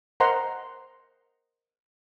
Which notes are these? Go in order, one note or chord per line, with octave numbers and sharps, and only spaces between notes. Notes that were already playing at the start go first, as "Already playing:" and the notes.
A#4 C5 D#5 F#5 A#5 C6